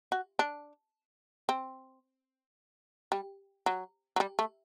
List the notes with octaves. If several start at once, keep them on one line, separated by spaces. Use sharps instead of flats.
F#4
D4
C4
G3
F#3
F#3
G3
A3